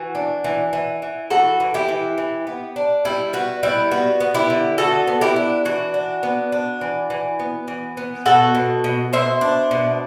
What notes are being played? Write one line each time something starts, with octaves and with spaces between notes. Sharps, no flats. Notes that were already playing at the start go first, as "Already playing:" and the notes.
Already playing: E3 F#4
D4
E3
E3
E3
E3 F#4 A4
E3
E4 G4
E3
E3
B3
D4
G3 E4
B3 F#4
G3 E4
B3 F#4
B3
E4 G4
D3
B3 F#4 A4
B3
E4 G4
D4
E3 F#4
D4
B3
D4
E3
E3
B3
E3
B3
B2 F#4 A4
B2
B2
B2 C5 E5
D4
B2